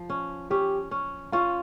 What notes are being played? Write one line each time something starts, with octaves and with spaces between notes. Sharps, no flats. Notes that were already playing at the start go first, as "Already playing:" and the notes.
Already playing: F3
C#4
C#4 G4
C#4
C#4 F4